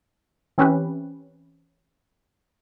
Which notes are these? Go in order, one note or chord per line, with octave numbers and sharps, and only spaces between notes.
E3 C4 C#4 E4 G4 B4